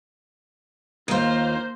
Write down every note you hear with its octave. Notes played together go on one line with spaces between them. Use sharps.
D#2 A#3 F4 C5